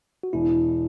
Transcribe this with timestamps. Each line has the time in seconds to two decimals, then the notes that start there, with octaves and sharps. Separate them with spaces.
0.23 F#4
0.33 E1 E4